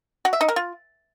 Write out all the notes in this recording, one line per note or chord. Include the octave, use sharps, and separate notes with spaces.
F#4
E5
D#4
A#4
F4